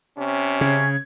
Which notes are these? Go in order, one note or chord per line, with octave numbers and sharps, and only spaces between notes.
C3 C#4
C#3 G#6